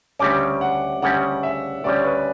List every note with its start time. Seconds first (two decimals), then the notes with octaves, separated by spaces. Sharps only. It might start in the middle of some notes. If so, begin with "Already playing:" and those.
0.19 D2 C#3 G3 C#4 D6
0.61 F#5
1.02 D2 C#3 G3 C#4 F#5
1.43 E5
1.84 D2 C#3 G3 C#4 D5
2.04 B4